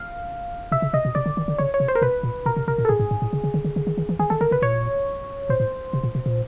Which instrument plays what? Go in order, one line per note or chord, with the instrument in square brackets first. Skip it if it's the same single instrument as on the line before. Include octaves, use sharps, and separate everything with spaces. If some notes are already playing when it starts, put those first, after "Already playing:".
Already playing: [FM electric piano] F5
[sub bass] C3 [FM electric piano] E5
[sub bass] C#3
[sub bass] C3 [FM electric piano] D#5
[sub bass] B2
[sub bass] C3 [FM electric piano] D5
[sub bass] D3
D#3
D3
[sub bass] C#3 [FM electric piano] C#5
[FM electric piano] C#5
[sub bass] C3
[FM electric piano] C5
A#4
[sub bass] B2 [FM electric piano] B4
[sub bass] A#2
[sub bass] B2 [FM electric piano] A#4
[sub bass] C3
[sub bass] C3 [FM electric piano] A#4
[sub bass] A#2
[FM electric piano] A4
[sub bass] A2 [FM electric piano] G#4
[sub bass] G#2
G#2
A2
C#3
C#3
D3
D3
D3
D#3
D#3
E3
[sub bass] D#3 [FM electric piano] G#4
[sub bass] D#3 [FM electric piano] A4
[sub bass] D3 [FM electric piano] A#4
[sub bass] C#3 [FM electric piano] B4
[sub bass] A#2 [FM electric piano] C#5
[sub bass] A#2 [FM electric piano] C5
[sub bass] A2
C3
A#2
B2
A#2